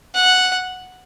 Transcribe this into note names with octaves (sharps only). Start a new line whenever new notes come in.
F#5